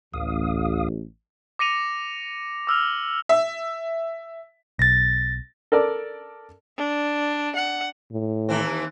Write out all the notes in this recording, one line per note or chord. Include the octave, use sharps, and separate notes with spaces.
A1 D2 F5 D#6
D6 A#6 C#7 D#7 F7
D6 E6 F6 F7
E5
B1 A6 A#6
A4 A#4 D5
D4
F#5
A2
D#2 E3 C4